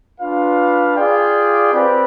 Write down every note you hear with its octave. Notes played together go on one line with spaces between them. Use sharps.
D4 F4 B4 F5
F4 G#4 D5 G5
C4 G4 B4 D5